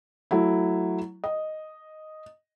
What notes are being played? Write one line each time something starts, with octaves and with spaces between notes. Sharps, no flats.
F#3 A3 E4
D#5